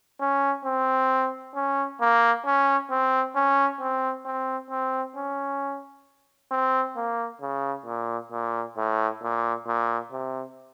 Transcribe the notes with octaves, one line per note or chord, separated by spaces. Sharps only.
C#4
C4
C#4
A#3
C#4
C4
C#4
C4
C4
C4
C#4
C4
A#3
C#3
A#2
A#2
A2
A#2
A#2
C3